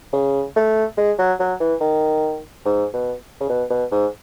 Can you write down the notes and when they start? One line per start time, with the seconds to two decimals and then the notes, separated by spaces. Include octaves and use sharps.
0.13 C#3
0.56 A3
0.97 G#3
1.19 F#3
1.40 F#3
1.60 E3
1.81 D#3
2.65 G#2
2.93 B2
3.40 C#3
3.50 B2
3.70 B2
3.91 G#2